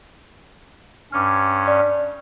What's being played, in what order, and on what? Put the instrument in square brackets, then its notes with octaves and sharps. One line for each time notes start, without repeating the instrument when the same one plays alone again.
[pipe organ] G2 C#4 [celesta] D6 F6
[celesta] D5